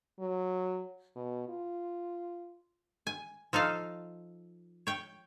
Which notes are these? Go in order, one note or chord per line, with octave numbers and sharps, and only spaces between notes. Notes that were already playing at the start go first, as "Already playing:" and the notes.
F#3
B2
F4
G#5
F3 D#4 A4 F5
C#5 G5